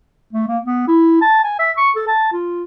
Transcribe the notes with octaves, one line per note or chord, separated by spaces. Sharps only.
A3
A#3
B3
E4
A5
G#5
E5
C#6
A4
A5
F4